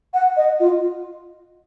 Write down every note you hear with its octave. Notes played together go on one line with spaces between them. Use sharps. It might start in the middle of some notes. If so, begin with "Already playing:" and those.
F#5
D#5
F4